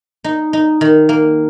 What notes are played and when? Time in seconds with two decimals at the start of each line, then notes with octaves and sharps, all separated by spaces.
0.24 D#4
0.53 D#4
0.81 D#3
1.09 A#3